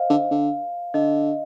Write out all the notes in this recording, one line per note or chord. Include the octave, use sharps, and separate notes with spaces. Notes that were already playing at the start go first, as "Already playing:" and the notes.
Already playing: C5 D#5 F5
D3
D3
D3 D#5